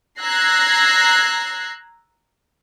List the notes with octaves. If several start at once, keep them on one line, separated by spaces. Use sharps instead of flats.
A#5 E6 F#6 G#6 A#6 C7